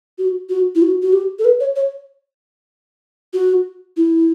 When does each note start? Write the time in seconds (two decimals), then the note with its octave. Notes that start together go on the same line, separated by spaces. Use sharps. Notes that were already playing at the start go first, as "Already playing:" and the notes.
0.18 F#4
0.49 F#4
0.75 E4
0.82 F#4
1.02 F#4
1.13 G4
1.39 A4
1.45 B4
1.60 C#5
1.76 C#5
3.34 F#4
3.97 E4